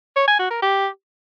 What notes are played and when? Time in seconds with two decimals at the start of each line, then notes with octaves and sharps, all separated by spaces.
0.16 C#5
0.28 G#5
0.39 F#4
0.51 A#4
0.62 G4